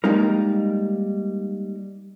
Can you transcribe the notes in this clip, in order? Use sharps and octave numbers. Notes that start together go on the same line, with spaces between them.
G3 G#3 A#3 D#4 A#4